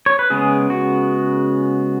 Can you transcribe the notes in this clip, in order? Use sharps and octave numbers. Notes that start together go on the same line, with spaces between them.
C#5
B4
C#3 G#3 B3 G#4
F#4